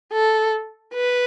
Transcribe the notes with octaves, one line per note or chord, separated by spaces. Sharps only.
A4
B4